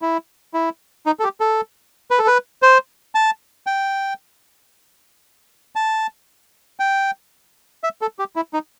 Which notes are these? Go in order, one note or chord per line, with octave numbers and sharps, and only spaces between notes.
E4
E4
D#4
A4
G4
A4
B4
A4
B4
C5
A5
G5
A5
G5
E5
A4
G4
E4
D#4